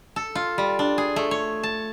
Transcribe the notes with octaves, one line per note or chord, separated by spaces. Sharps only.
A4
F4
G3
D4
G#4
A3
C#5
A5